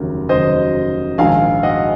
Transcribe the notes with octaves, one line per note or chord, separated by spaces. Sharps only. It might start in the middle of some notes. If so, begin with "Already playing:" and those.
Already playing: F1 D#2 C#3 F#3 A#4
F1 D#2 C#3 F#3 C5 D#5
A#1 G#2 D#3 F5 G#5
D#5 F#5